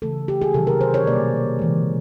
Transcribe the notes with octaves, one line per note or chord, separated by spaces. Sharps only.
C#3 E3 A3 A4
G4
G#4
C3 D#3 F#3 A4
A#4
C5
C#5
B2 G3 A#3 D5
C#3 E3 G#3